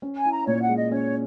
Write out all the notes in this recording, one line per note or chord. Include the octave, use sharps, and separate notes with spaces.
C#4
G#5
E4
A#5
A#2 C#5
F#5
G#3
D#5
C#4 C#5